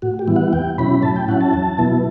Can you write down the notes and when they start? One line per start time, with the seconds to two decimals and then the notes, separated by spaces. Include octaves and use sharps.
0.02 A2 F#4
0.19 G4
0.27 E3 G3 B3 E4
0.36 F#5
0.53 E2 G5
0.78 B2 F#3 C#4 E4 B5
1.02 A2 A5
1.16 G5
1.28 F#3 C#4 E4 F#5
1.41 A5
1.54 E2
1.78 B2 F#3 B3 E4